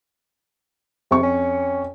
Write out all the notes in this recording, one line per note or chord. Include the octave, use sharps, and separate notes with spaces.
F2 C3 C#6
C#4